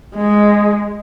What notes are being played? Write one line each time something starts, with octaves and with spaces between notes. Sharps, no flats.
G#3